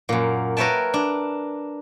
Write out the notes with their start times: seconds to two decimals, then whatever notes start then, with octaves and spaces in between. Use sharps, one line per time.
0.09 F#2 A#2
0.57 A#4 B4 C#5 E5 G5 A5
0.94 D4